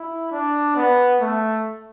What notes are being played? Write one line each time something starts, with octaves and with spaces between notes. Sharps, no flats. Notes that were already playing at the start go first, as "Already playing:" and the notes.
Already playing: E4
D4
B3
A3